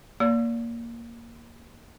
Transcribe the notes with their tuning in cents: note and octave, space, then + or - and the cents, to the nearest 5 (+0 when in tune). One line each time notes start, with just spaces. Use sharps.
A#3 +0 D5 -35